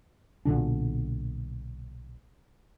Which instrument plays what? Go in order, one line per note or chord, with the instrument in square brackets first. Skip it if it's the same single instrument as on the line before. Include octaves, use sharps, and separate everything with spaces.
[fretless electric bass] B1 A#2 D3 D4